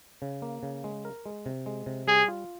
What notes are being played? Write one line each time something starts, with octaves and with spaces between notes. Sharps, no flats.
C#3
A#3
C#3
G#3
A#4
G#3
C3
G#3
C3
G3 G#4
F4